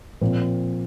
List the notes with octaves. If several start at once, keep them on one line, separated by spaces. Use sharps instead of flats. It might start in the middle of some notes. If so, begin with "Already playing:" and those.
A#2 F3 C4